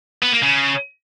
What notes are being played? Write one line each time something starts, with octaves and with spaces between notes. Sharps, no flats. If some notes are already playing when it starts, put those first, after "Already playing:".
B3
A#3
C#3